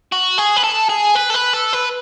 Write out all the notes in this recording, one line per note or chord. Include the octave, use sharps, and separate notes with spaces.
F#4
G#4
B4
A4
G#4
B4
A4
B4
A4
B4